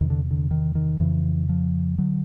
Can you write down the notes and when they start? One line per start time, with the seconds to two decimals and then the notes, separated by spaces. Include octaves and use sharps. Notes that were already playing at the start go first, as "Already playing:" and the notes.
0.01 E2 C3 D#3
0.10 D3
0.31 D3
0.51 D#3
0.75 D#3
1.00 F2 C#3 E3
1.49 F3
1.98 D3 F#3